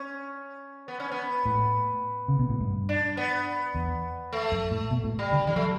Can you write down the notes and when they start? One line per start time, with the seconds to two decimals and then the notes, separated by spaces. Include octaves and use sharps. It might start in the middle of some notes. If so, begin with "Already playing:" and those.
Already playing: C#4
0.88 B3
1.00 C#4
1.11 B3
1.46 A2
2.28 C#3
2.39 B2
2.50 A2
2.60 G2
2.89 D4
3.17 B3
3.74 E2
4.33 A3
4.52 F#2
4.71 A2
4.91 B2
5.04 A2
5.19 G3
5.32 D3
5.47 E3 G3
5.56 F#3 A3